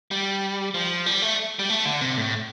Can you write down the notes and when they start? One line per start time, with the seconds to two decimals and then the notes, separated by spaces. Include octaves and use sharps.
0.11 G3
0.74 F3
1.06 G3
1.22 A3
1.59 G3
1.70 A3
1.85 D3
2.01 C3
2.17 A2